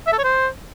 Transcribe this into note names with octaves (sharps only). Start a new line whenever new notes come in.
E5
A4
C#5
C5